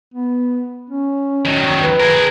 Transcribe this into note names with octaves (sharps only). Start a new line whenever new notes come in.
B3
C#4
D#3 F#3
B4
G#4 A#4